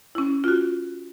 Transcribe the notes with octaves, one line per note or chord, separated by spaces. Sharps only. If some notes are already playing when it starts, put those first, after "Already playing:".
C#4 E4
F4 F#4